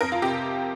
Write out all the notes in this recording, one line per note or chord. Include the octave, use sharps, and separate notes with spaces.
F2 A#4
F4
C3 G4